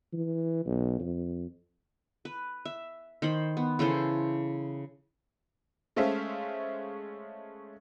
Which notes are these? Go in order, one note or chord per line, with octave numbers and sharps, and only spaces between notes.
E3
B1
F2
B4
E5
D#3 C5 B5
B3
C#3 E3 A4 C5
G#3 A3 C#4 C5 E5 F5